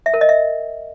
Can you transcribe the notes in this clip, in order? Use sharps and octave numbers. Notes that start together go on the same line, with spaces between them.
E5
A#4
D#5
E5